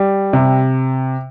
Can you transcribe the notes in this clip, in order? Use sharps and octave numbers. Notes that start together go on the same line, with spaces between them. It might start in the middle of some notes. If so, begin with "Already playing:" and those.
Already playing: G3
C3